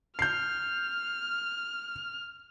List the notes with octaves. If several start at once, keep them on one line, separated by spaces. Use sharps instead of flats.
F6 G6 C7